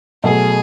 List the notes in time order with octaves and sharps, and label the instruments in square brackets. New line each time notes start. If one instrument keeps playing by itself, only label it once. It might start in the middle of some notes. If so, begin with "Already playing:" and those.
[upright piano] B2 F#3 A3 [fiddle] G#4